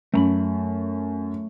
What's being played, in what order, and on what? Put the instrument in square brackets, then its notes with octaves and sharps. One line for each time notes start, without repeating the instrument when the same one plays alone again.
[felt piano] F#2 [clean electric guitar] A3 A#5 B5